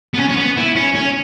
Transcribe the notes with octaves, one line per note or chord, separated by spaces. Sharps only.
B3
C#4
C#4
B3
E4
C#4
C#4